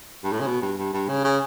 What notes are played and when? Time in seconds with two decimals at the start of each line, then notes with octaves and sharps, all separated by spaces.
0.24 G2
0.32 A2
0.40 C#3
0.47 B2
0.62 G2
0.78 G2
0.93 G2
1.09 C#3
1.24 C#3